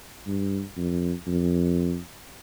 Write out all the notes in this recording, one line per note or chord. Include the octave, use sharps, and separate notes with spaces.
G2
F2
F2